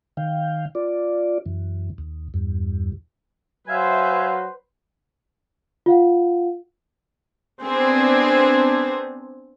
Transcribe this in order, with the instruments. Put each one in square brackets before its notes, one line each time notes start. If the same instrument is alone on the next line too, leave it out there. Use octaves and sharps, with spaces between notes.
[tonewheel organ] D#3 F5 G5
F4 D5
F#2 E3
D#2
E2 G2
[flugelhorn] F#3 [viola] B4 C5 [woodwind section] E5 F5 G#5
[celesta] F4 F5 F#5
[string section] B3 C4 D4 G#4 B4 C5